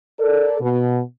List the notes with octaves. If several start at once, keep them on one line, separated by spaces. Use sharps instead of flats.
A4 A#4 D5
B2